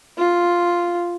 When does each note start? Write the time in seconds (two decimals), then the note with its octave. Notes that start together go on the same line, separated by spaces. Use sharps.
0.18 F4